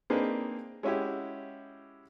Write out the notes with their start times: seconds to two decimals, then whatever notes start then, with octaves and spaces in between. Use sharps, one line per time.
0.10 A#3 C4 D4 D#4 G#4 B4
0.83 G#3 C#4 E4 F#4 G4